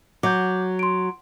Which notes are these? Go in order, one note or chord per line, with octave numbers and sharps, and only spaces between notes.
F#3 D6 G6
C6 D7